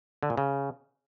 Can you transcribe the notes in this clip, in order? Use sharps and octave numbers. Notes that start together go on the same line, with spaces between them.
D3
A#2
C#3